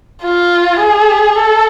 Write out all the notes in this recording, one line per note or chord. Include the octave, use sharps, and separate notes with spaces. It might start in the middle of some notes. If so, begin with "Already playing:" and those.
F4
G#4
A4